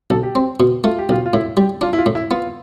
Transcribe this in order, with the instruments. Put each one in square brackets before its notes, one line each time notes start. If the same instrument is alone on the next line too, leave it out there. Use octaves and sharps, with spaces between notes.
[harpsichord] B1 [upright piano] A4
[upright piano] G4
[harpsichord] C4
B2
[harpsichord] A3 [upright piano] F4
[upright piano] G4
[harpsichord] B1 [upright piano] F4
[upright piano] F4
[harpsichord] A2 [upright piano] E4
[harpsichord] G3 [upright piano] G4
[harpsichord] D4 [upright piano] F4
[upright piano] E4
F4
[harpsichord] A2
[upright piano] E4
[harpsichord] B3 [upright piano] F4